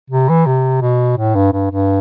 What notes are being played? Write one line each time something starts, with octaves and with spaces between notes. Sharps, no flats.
C3
E3
C3
B2
A2
G2
G2
G2